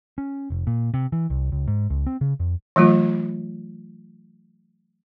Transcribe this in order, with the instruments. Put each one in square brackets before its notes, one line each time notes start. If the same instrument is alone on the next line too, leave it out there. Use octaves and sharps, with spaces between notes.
[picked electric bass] C#4
F1
A#2
C3
E3
C2
C#2
G#2
C#2
C4
C#3
F2
[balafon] E3 F#3 A3 F4